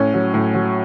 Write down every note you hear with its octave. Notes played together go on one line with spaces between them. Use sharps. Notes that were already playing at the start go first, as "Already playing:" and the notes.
Already playing: A2 C#4
F#3
A2
F#3